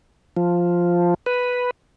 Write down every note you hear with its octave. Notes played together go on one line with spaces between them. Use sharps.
F3
B4